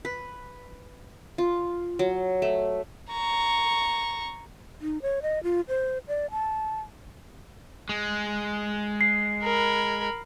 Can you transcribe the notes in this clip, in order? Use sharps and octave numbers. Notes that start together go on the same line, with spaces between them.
B4
F4
F#3
A3
A#5 C#6
D#4
C#5
D#5
F4
C5
D5
A5
G#3
C7
A#4 B5